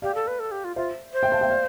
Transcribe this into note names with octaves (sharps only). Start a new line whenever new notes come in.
G4 D5 F5
A4
B4
A4
G4
F4
F4 C5 E5
C5
E5 G5
F5 A5
E5 G5
D5 F5